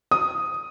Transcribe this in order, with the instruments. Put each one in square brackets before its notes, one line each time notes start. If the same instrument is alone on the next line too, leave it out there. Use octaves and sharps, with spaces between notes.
[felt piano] D#6